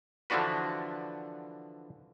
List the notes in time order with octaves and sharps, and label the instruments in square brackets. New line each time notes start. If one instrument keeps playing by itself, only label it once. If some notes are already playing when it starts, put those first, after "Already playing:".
[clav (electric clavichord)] D3 E3 F3 D4 F#4 B4